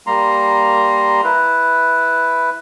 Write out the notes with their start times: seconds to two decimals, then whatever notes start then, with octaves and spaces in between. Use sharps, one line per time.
0.07 G3 A#3 A#5 C6
1.24 E4 B4